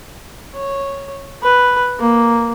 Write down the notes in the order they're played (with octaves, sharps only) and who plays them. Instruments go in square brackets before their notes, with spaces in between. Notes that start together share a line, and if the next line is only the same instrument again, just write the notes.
[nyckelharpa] C#5
B4
A#3